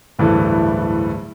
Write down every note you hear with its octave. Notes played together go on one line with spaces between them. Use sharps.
D1 G2 E3 A3